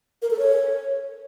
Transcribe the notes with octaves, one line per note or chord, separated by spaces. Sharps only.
A#4
A4
C#5